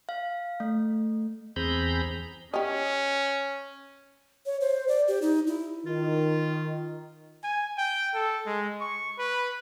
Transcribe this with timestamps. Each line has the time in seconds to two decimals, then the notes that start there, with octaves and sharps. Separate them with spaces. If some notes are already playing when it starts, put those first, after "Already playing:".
0.09 F5
0.60 A3
1.56 E2 C4 G#4 A#5 B5 G6
2.54 C#4 G4 D#5
4.46 C#5
4.61 C5
4.88 D5
5.08 G4
5.22 D#4
5.47 E4
5.86 D#3 F4
7.44 G#5
7.78 G5
8.14 A4
8.46 G#3
8.81 C#6
9.18 B4